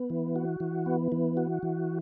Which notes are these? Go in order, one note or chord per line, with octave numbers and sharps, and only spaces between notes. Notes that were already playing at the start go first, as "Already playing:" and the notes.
Already playing: B3
E3
F#4
E3
B3
E3
F#4
E3